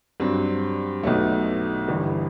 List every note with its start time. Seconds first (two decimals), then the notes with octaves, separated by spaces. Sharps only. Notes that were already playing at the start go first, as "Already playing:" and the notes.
0.20 G2 F#3 C4
1.03 B1 B2 A3
1.88 G1 G2 E3